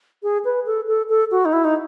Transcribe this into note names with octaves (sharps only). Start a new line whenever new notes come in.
G#4
B4
A4
A4
A4
F#4
D#4
E4
D#4